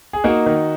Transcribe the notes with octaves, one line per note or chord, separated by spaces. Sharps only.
G#4
A#3 D#4 F#4
D#3